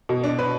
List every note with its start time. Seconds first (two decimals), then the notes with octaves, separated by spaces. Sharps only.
0.09 B2
0.24 D4
0.39 B4